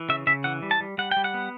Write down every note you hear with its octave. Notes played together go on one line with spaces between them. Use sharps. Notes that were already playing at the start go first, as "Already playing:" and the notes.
Already playing: E3
C#3 E5
C#3 E5
E3 F#5
G3
A5
G3
G3 F#5
G5
G3
F#5
B3